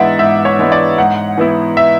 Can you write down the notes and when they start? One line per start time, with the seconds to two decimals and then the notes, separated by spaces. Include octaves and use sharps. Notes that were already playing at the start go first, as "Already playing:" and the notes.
Already playing: G#2 E3 G#3 B3 D4 D5 E5 F#5
0.19 G#2 E5
0.45 C#5
0.59 E3 G#3 B3 D4
0.72 D5
0.98 G#2 F#5
1.38 E3 B3 E4
1.77 E5